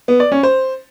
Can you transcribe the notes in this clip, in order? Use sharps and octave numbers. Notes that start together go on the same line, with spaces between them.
B3
D5
C#4
C5